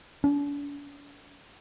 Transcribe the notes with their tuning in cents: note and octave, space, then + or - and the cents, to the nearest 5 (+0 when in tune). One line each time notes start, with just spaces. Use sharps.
D4 -45